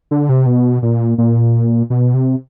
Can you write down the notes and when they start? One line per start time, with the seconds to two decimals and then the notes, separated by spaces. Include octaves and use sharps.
0.11 D3
0.29 C3
0.46 B2
0.83 A#2
1.18 A#2
1.90 B2
2.14 C3